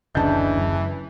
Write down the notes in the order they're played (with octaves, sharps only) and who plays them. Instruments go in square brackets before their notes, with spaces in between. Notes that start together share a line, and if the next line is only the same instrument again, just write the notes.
[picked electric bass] F#1 D2 C#3 [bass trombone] E3 [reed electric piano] D4 D#5 [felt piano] A5 G6
[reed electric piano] F#2